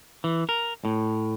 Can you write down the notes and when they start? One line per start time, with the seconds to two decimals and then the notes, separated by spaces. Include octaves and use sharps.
0.24 E3
0.49 A#4
0.85 A2